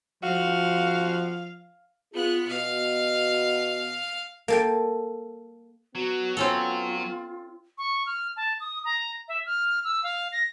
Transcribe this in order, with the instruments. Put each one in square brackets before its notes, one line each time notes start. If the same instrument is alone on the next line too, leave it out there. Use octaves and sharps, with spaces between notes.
[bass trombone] F3 [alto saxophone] F#4 [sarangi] F5
[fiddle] B3 F#6 [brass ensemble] F4 G#4
[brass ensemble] B2 [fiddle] F5
[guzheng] A#3 A4 G5
[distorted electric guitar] F#3 [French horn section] B3 [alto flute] F#4
[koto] C4 C#4 A4 [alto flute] F4
[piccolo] C#6
F6
A5
D#6
A#5
E5
F6
E6
F5
A#6